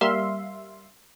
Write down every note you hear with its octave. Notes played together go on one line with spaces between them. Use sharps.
G3 A#3 E5 F5 C6